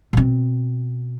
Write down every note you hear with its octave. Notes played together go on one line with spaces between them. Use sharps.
B2 C4